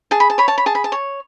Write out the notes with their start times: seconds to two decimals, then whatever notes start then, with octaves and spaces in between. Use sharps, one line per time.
0.11 G#4 A5
0.20 B5
0.30 A5
0.38 C#5 B5
0.48 A5
0.58 B5
0.66 G#4 A5
0.75 B5
0.84 A5
0.92 C#5